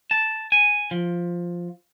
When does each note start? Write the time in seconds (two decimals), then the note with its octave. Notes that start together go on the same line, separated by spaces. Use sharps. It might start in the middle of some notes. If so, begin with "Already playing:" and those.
0.11 A5
0.52 G#5
0.91 F3